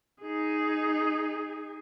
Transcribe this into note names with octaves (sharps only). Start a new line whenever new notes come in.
D#4 G#4